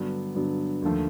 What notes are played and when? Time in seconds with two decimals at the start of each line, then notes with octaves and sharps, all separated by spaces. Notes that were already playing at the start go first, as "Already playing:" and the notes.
Already playing: G2 D3 F#3 B3
0.35 G2 D3 F#3 B3
0.82 D#2 D3 F3 A3